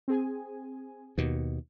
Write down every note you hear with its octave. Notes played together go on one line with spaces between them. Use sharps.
C4 G#4 G#5
D#2 B2